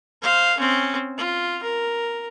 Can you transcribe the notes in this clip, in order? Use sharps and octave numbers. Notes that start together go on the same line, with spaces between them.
C5 F5
C4 C#4
F4
A#4